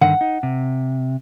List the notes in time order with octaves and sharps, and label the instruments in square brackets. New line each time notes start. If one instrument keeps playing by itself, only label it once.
[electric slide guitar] G2 D3 D#3 [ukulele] F#5
[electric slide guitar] D#4
C3